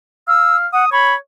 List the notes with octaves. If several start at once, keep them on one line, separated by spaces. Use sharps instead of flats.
F5 E6
F#5 D#6
C#5 B5